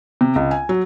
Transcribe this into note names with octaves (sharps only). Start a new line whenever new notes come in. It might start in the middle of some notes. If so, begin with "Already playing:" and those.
C3
C#2
G#5
F#3